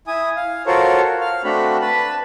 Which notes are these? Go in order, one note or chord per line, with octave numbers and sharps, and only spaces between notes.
E4 G#5 D#6
F5
F4 F#4 A4 A#4 C5 C#5
F5 F6
A3 C4 D4 F#4 B5
B4 A5 B5